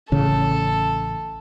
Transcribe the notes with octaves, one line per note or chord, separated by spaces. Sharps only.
A1 C#3 A4